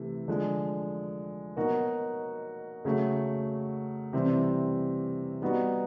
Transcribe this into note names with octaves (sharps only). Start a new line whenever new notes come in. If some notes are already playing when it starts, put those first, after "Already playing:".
Already playing: C3 E3 A3
D3 F3 G#3
B2 F#3 A#3 D#4 F#4
C#3 F#3 A3
C3 E3 G3 C4
G3 B3 D#4 F#4